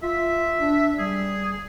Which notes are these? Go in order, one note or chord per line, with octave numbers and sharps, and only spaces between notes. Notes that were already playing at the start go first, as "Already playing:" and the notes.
F4 E5
D4
G3 G#4